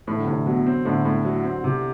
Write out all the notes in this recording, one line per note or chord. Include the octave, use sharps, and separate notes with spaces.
A2 E3
D3
C3
A2 D3
B2 F#3
C4
A2 D3
A2
F#3
C4
C3